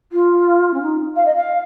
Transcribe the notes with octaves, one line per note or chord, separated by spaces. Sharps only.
F4
C#4
D#4
F5
D#5
F5